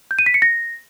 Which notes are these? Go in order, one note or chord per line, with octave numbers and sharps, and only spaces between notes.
G6
D#7
B6
C#7
A#6